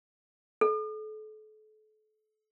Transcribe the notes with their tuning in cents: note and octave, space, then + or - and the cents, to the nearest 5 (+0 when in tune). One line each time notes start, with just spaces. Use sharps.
A4 -35